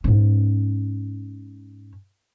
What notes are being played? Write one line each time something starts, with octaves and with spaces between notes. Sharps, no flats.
G#2 C#4